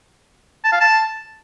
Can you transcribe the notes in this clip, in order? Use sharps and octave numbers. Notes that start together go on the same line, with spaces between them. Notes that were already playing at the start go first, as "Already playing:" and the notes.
A5
F5
A5